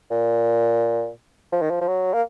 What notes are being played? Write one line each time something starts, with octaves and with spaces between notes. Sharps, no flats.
A#2
F3
D#3
F3
F3
F#3
A#3